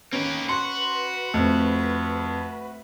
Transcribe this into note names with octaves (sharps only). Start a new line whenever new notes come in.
A#3 C#4 G4 B4
F#4 C6
F2 A3 C4